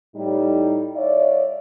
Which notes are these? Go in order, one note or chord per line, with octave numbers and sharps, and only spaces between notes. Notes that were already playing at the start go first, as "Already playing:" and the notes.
A2 G3 D#4
C#5 D5 E5 F5